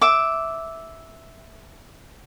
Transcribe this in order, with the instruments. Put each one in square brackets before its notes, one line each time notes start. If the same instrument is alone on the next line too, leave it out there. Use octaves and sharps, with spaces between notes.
[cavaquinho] E5 D6